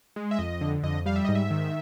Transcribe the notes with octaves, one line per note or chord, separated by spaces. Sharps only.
G#3
E5
F2 D#5
D3
F2 D#5
G3 F5
E5
G#2 D#5
E5
D#3